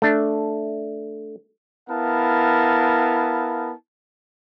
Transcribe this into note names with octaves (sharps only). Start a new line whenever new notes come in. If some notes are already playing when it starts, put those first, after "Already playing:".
A3 D4
B3 E4 A#4 F5 A5